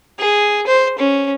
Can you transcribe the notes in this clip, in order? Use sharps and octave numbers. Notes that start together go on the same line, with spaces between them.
G#4
C5
C#4